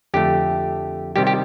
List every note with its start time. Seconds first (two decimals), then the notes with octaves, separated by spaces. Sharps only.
0.14 F2 D3 A3 G4
1.16 C3 D#3 G3 G4
1.27 G4